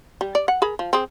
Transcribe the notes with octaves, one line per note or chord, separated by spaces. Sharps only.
G3
D5
F#5
G#4 A#4 B5
F3
C4 G#4